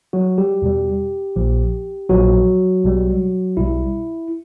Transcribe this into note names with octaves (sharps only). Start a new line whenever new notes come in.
F#3 F#4
G3 G4
E2 B2 G3
A#1 A#2 F3
A#1 A#2 F3 F#3 F#4
B1 B2 G3
B1 B2 G3 E4